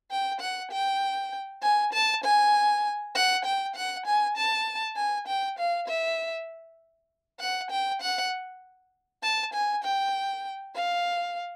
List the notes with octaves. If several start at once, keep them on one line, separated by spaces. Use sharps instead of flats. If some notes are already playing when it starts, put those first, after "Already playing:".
G5
F#5
G5
G#5
A5
G#5
F#5
G5
F#5
G#5
A5
G#5
G5
F5
E5
F#5
G5
F#5
A5
G#5
G5
F5